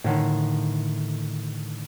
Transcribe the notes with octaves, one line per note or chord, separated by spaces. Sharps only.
A2 D3 D#3